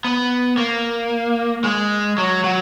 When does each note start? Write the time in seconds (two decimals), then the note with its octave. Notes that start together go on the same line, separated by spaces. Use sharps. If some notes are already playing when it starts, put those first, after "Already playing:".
0.04 B3
0.58 A#3
1.64 G#3
2.18 F#3
2.44 F#3